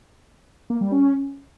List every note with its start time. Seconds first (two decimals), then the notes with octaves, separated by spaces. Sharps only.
0.70 A#3
0.81 G3
0.92 C#4